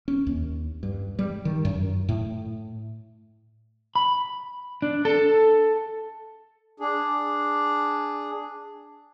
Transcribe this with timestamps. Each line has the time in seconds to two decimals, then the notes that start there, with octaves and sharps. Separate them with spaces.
0.08 C#4
0.27 D#2
0.83 G2
1.19 G3
1.45 D#3
1.65 F#2
2.09 A2
3.96 B5
4.82 D4
5.05 A4
6.80 D4 G#4